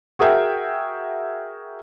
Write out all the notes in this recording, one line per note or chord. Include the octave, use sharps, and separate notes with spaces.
F#4 G#4 A#4 E5 G5